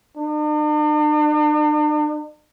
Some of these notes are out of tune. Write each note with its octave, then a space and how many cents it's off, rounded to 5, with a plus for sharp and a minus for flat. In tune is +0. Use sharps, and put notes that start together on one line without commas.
D4 +45